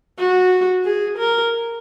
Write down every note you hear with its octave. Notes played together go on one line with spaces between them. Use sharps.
F#4
G#4
A#4